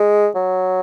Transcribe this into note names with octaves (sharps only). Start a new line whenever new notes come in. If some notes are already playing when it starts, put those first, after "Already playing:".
Already playing: G#3
F#3